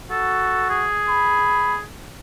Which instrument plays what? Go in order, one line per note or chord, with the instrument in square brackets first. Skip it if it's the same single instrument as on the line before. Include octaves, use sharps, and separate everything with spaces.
[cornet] F#4 [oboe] A4
[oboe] G#4
[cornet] B5